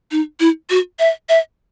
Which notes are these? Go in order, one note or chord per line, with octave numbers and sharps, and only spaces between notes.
D#4
E4
F#4
E5
E5